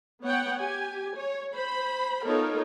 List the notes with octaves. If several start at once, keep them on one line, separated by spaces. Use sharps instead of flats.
B3 C#5 F#5 G5
G4 G#5
C#5
C5 B5
B3 D#4 F4 A4 A#4 C#5